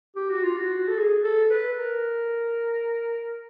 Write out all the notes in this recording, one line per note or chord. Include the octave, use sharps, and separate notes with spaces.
G4
F#4
F4
F#4
A4
G#4
A4
B4
A#4